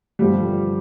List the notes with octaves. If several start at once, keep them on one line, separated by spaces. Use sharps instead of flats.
G2 D3 F3 G3